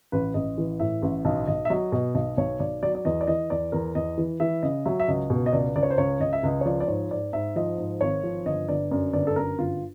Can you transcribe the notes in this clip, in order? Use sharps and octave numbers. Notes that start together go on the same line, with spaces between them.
A1 B4
A1 D#5
E3
A2 E5
A1
B1 D#5
B1 D#5
E5
F#3 D#5
B2 D#5
B1 D#5
B1 C#5
B1 D5
F#3 D5
D5
E2 D#5
D5
E3 D#5
E2 D5
E2 A#4
E2 D#5
E3
E3 E5
C#3 D#5
F#3 E5
E5
C#2 D#5
B2
D#5
C#2 D5
C#2 D5
C#5
C5
C#2 C#5
C#2 D#5
E5
C#2 D#5
C#5
F3 D5
D5
G#2 C#5
G#2 D5
G#2 E5
F3 D#5
G#2
G#1 C#5
F3
G1 D#5
G1 D5
F#2 D5
G1 D5
A4
F#2 A#4
G1 F4